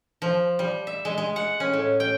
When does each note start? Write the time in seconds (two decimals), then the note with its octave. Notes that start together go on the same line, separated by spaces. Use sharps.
0.22 F3
0.59 G3
0.87 E5
1.05 G#3
1.18 G#3
1.36 F#5
1.60 C#4
1.73 A2
2.00 G5